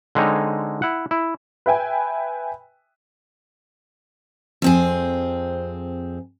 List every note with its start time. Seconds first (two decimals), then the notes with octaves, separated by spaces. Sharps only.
0.15 D3 G#3 C4 D#4 C#5
0.82 E4 F#5
1.11 E4
1.66 B4 E5 G5 G#5
4.62 F2 C4 G#4